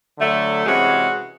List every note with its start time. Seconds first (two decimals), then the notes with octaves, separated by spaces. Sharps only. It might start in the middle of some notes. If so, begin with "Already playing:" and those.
0.17 D3 F#3 A3
0.65 C3 E3 G#3 C#4 F#4